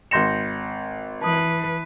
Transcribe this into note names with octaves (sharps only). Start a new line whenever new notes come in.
G#1 C6 G6 A#6 C#7 E7
E3 B4 A5 D#6